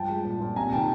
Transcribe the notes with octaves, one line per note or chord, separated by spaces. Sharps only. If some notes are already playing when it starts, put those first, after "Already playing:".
Already playing: G2 F3 G5 A5
G#3
A#2
A#2
C3 G#5 A#5
D#3 G5 A5